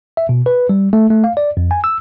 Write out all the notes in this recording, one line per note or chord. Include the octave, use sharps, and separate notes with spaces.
E5
B2
B4
G3
A3
A3
F5
D5
F2
G#5
E6